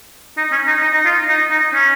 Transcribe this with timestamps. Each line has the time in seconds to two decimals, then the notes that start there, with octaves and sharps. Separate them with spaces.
0.37 D#4
0.52 C#4
0.67 D#4
0.82 D#4
0.94 D#4
1.05 F4
1.28 D#4
1.51 D#4
1.74 C#4